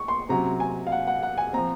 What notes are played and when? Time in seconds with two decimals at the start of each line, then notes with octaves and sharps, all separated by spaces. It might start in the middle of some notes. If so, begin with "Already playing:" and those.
Already playing: C#6
0.08 C6
0.29 C3 F#3 C#4 A#5
0.60 G#5
0.87 F5
0.92 F#5
1.07 F#5
1.23 F#5
1.38 G#5
1.53 F3 C4 A#5